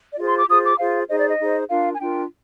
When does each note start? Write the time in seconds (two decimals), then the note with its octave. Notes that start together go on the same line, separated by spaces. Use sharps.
0.12 D5
0.17 F4 G#4 C5 D#5
0.27 C6
0.38 D6
0.48 F4 G#4 C5 D#6
0.64 D6
0.78 F4 G#4 C5 F5
1.08 D#4 G#4 C5 D#5
1.19 D5
1.28 D#5
1.39 D#4 G#4 C5
1.68 D4 F4 A#4 F5
1.94 G#5
1.99 D4 F4 A#4 G5